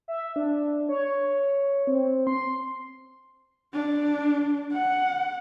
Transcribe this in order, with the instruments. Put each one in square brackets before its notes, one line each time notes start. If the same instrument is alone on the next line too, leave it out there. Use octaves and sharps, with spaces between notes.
[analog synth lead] E5
D4
C#5
C4
C6
[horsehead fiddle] D4
F#5